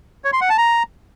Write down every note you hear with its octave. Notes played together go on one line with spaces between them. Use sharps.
C#5
C6
F#5
A5
A#5